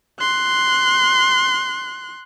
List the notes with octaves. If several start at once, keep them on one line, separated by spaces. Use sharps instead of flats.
C6 F#6